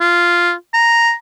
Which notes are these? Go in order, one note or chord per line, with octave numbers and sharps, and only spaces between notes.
F4
A#5